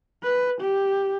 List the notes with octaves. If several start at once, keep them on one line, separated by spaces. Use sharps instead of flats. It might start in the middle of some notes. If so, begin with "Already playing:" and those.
B4
G4